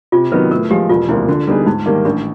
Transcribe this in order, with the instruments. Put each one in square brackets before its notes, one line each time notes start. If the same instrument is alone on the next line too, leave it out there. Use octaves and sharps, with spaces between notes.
[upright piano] C3 [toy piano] F4
[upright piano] D#3 F#3 B3 D#4 [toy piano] B4
[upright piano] A2 [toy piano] A#4
[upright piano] F3 G#3 [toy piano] G4
[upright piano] E1 [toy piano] F4
[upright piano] D2 C3 F3 A#3 [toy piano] E4
[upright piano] D3
G3 B3 D#4 G#4
[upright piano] G#2 [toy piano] D#4
[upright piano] D#3 G3 A#3 [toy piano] D#4
[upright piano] A1 [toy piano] D4